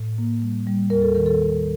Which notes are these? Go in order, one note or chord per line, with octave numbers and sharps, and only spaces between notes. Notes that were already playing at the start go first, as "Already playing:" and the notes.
Already playing: A2
A#3
G3
G3
D#2 A#4
A4
D#3 A#4
A4
D#3